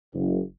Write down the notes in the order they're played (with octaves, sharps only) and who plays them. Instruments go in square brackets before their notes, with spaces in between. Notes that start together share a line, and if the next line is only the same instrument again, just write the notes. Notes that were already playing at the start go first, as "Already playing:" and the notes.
[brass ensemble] F#1